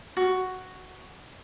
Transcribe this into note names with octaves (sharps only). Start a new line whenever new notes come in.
F#4